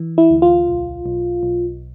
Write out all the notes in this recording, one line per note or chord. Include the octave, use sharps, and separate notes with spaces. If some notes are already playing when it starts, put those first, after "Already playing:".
Already playing: E3
E4
D2
F4
B1
B1
B1